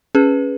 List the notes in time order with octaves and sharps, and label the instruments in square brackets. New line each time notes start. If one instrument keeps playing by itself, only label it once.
[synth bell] C#4 G#4 B4